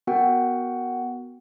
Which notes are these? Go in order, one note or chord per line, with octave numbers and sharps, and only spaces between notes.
B3 F#4 A#4 F#5 G5